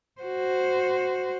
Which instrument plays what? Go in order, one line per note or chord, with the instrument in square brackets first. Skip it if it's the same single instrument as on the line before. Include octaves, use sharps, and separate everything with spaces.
[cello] F#4 C5